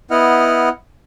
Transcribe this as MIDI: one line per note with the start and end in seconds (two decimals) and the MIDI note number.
0.11 0.69 59
0.11 0.69 64
0.11 0.69 75
0.11 0.69 78
0.11 0.69 89